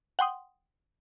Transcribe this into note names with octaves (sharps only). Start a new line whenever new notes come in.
F#5 G5 C6 D#6